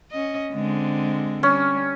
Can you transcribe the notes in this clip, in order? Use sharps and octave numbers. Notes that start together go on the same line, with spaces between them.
C#4 D#5
D3 G#3 C4
G3 C#4